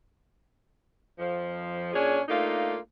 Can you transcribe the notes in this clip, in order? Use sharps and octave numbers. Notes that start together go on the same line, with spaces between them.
F2 F3
A#2 C#4 D4 G#4 C#5
A3 A#3 D4 D#4 F4